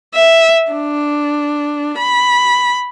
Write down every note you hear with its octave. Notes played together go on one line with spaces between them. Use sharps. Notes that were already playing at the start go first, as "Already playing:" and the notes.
E5
D4
B5